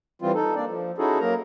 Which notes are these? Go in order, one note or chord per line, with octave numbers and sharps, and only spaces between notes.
E3 G3 C4 F4
D#4 A4
A#3 D4 D5
F3
C#4 D#4 E4 F#4 G#4 A4
F#3 A#3 A#4 A#5